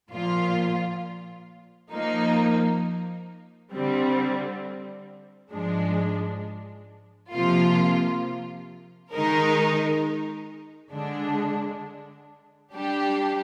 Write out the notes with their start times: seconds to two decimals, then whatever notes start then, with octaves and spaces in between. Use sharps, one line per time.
0.12 A#2 F3 A#3 F4
1.92 F3 A#3 D#4
3.72 D3 G3 C4
5.52 G#2 F3 G#3 D4
7.33 C3 F3 A#3 F4
9.12 D#3 G#3 D#4 A#4
10.93 D3 G#3 D4
12.73 G3 D4 G4